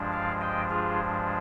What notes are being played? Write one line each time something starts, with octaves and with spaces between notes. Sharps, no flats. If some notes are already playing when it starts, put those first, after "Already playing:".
Already playing: G2 F3 G#3 D4
D5 F5
D#5 G5
F4 G#4